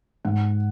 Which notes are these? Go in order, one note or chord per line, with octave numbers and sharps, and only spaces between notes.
G#2 F#5